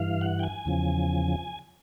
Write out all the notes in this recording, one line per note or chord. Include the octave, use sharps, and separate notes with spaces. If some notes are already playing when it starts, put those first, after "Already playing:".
Already playing: G2 E3 F5
F#5
G5
G#5
E2 C#3 F3